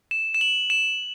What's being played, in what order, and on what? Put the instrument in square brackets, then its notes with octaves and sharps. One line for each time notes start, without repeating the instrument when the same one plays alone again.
[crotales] E7
E7
F#7
E7